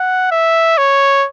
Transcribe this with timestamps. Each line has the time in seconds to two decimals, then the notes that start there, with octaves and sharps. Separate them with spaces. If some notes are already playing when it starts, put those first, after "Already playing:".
Already playing: F#5
0.31 E5
0.78 C#5